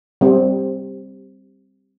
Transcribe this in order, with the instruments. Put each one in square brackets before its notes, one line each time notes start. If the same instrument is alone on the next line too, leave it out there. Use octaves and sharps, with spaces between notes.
[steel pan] G3 C4 G4